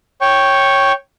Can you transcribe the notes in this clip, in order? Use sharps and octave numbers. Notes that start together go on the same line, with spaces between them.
C#5 G5 C#6